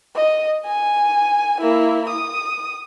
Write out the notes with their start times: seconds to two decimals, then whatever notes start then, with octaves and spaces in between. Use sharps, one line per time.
0.16 D#5
0.66 G#5
1.60 A#3 E4
2.09 D#6